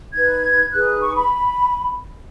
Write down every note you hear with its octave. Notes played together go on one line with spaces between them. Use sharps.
D#4 B4 G#6
D#4 G#4 B4 F#6
C#6
B5